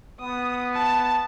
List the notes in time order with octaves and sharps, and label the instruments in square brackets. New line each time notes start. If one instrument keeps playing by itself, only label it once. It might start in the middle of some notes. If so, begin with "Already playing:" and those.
[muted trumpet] B3 [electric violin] D#6
[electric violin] A5